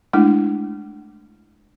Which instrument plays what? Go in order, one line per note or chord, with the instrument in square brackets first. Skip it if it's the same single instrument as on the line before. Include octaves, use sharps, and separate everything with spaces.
[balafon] G#3 A3 D4 E4